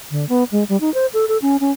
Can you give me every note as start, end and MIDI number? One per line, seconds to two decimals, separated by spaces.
0.11 0.27 50
0.29 0.44 59
0.52 0.64 56
0.69 0.80 55
0.81 0.92 63
0.94 1.06 72
1.14 1.25 69
1.28 1.38 69
1.42 1.57 61
1.60 1.72 61